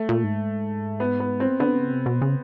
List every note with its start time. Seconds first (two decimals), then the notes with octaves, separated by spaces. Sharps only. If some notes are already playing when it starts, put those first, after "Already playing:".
Already playing: A3
0.09 A#2
0.24 G#2
1.00 B3
1.20 B3
1.40 C4
1.60 D3 B3
1.76 C#3
1.91 C3
2.06 B2
2.22 C#3